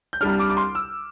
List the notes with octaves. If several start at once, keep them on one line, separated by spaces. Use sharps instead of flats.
G6
C2 C3 G3 D4 F6
D6
D6
C6
E6